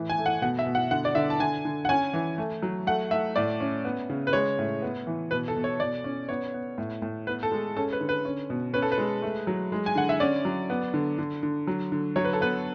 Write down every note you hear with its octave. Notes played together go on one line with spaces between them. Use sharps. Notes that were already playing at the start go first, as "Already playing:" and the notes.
Already playing: A2 E3
G#5
A3
F#5
B2 F#5
E5
B2
F#5
D3 F#5
D5
D3 E5
A5
D3 G#5
D3
F#5
C#4 G#5
E3
A3
F#3
A3 F#5
A3 E5
A2 D5
C#4
B3
C#3
B4
G#3 C#5
A2
B3
E3
B2 B4
A4
B2
C#5
B2 D5
C#4
B3 C#5
B3
A2
A2
B3 B4
A4
G#3
C#4 A4
B4
D3
B4
C#4
B2
C#4 B4
A4
B4
G#3
A3
F#3
G#3
G#5
D3 F#5
E5
C#4 D5
F#3
B3
D3
D3
D3
F#3
D3
F#3 C#5
B4
A4
B3 B4